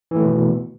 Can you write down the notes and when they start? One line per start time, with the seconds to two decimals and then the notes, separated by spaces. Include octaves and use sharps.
0.11 E3
0.16 A3
0.21 D#3
0.25 B2